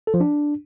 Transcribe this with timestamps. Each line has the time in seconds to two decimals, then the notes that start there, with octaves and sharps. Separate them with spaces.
0.07 A4
0.14 F3
0.20 D4